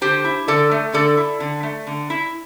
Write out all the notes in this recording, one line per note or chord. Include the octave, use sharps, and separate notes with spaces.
D3 G4 C5
E4
D3 A4 D5
A3
D3 A4 D5
E4
D3
A3
D3
E4